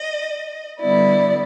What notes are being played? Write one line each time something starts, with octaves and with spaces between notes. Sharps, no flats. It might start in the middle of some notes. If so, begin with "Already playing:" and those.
Already playing: D#5
D3 G3 B3 E4 D5